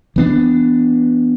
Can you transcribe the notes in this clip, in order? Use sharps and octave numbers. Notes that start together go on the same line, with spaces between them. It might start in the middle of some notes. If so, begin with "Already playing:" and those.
E3 B3 D4